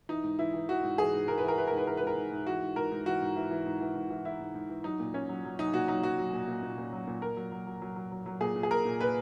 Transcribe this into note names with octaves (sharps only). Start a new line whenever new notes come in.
E3 D#4
G#2
E3 E4
E3
E3 F#4
G#2
E3 G#4
G#2
G#2 A#4
B4
E3
A#4
E3 B4
G#2 A#4
B4
E3 A#4
B4
G#2 A#4
G#2
G#2
E3 F#4
G#2
G#2 A#4
G#2
E3 F#4
G#2
E3
E3
G#2
E3
G#2
E3
E3 E4
G#2
G#2
E3
F#3 D#4
A#2
A#2 C#4
F#3
F#3
F#3 D#4
A#2 F#4
F#3 D#4
F#3 F#4
F#3
A#2
A#2
A#2
A#2
F#3
A#2
A#2 A#4
F#3
F#3
F#3
F#3
F#3
F#3
F#3
A#2 G#4
A#2
G#4
A#2 A#4
A#2
A#2 B4